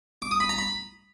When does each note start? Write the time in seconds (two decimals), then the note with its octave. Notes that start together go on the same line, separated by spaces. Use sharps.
0.22 D6
0.31 D#6
0.40 B5
0.49 A#5
0.58 B5